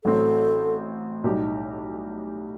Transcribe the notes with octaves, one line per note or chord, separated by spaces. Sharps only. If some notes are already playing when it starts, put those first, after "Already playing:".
A1 A2 F#3 C4 A4
B1 A2 G3 D#4 G4